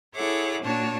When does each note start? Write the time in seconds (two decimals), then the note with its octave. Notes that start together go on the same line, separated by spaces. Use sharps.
0.15 E4 G#4 A4 C#5 F#5 D6
0.62 A#2 D4 F#4 C#5 A5